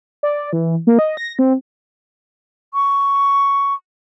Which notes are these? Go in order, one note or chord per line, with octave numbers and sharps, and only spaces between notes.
D5
E3
A#3
D#5
A#6
C4
C#6